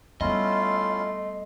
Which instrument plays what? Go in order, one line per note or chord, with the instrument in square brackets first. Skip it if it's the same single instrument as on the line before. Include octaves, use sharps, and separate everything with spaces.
[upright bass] G3 B3 [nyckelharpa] A3 C6 [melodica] C#4 E4 F4 [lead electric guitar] D#5